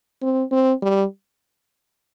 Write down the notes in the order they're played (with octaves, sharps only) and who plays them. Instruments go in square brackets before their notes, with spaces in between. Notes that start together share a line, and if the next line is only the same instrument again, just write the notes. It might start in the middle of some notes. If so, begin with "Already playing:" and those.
[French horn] C4
C4
G3